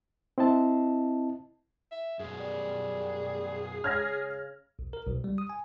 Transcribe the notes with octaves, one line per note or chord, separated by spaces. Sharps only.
C4 E4 D#5 A5
E5
F#2 B2 G#4
G3
C#3 F6 G#6 A#6
B1
A#4
B1
G3
D#6
G#5